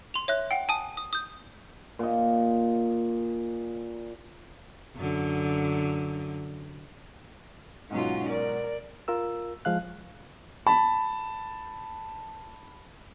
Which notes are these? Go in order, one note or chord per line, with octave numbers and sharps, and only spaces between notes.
C6 F7
C#5 E5 F#6
F#5 G5
G#5 A5 D#6
D#6
D#6 G6
A#2 D#5
F#2 D3
G#2 B2 F#3 C#4 D#4 F4 F#4
A#4 D5
F4 A#4 E6
F3 G#3 F5 F#6
A5 B5